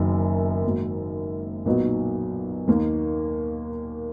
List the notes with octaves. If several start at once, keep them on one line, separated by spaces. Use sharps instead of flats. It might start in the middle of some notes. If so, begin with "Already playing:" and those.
Already playing: F#1 F#2 D#3
G#2 D#3 F#3 A#3
B1 A#2 F#3 B3 D#4
D#2 D#3 A#3